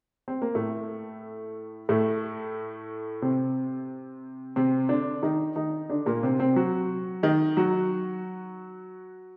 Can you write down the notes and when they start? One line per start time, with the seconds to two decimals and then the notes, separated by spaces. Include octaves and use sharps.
0.28 C4
0.42 A#3
0.55 A2 A3
1.89 A2 A3
3.22 C3 C4
4.56 C3 C4
4.89 D3 D4
5.22 D#3 D#4
5.56 D#3 D#4
5.90 D3 D4
6.06 A#2 A#3
6.23 C3 C4
6.40 C3 C4
6.56 F#3 F#4
7.23 D#3 D#4
7.57 F#3 F#4